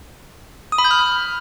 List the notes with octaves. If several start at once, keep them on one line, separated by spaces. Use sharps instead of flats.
D#6
B5
G6
F6